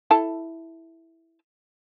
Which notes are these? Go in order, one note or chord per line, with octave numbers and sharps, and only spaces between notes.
E4 A4 A5